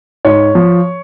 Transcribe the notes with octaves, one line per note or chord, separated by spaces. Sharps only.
G#2 C#5
F3